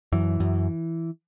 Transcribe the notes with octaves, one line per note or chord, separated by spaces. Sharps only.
F#2 E3
F#2